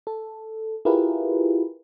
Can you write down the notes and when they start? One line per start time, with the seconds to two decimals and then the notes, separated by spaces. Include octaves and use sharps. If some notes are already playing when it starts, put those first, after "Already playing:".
0.07 A4
0.85 E4 F4 G4 G#4 A#4 B4